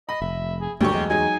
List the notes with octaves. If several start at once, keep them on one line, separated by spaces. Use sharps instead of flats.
D#5 B5
F1 E5
G#4
D2 G2 D3 F#3 G4 C#6
E2 G#3
F#3 D#4 G#4 G#5